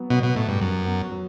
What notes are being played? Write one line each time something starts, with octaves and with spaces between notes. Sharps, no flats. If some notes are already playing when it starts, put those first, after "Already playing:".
Already playing: F#3 B3
B2 F#3
B2
A2 F#4
G2
F#2 F#3
B3
F#3